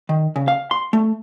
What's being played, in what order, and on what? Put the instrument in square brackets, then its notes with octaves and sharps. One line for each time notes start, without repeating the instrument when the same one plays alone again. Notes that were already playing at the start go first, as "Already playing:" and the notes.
[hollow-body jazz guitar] D#3
C#3
F5
C6
A3